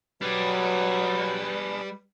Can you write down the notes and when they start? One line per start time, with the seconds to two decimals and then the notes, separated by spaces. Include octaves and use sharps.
0.22 F#3 G3 D4 G#4 B4